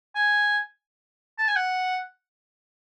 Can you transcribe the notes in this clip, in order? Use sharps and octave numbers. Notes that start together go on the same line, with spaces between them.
G#5
A5
G#5
F#5